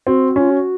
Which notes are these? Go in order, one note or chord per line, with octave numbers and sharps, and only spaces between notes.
C4 F#4
C#4 F4
F#4